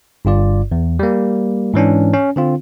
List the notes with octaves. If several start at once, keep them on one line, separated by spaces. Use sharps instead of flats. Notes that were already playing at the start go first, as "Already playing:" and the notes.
G1 G2 F4 D5
E2
G3 A#3
G#2 E3 C#4 D4
C#4
D3 C4 F4